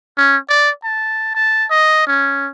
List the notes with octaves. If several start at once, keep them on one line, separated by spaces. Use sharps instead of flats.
C#4
D5
A5
A5
D#5
C#4